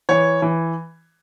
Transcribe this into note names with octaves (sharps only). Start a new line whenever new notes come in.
E3 C#5
E3